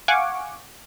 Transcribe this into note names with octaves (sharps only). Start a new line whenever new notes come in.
F5 F#5 G#5 C#6 D6